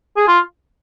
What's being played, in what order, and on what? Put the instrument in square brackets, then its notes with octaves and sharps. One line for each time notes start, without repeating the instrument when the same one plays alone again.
[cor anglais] G#4
F4